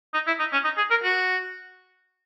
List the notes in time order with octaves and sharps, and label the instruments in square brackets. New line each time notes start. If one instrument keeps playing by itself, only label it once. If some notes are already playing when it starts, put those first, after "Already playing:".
[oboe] D#4
E4
D#4
C#4
D#4
G#4
A#4
F#4